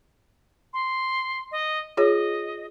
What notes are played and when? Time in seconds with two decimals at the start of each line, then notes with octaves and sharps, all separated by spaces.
0.73 C6
1.52 D#5
1.97 F4 G#4 C#5 D#5